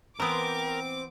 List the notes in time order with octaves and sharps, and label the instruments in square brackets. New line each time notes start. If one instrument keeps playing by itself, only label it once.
[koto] E3 B3 [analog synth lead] C4 [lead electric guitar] A#4 [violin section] D6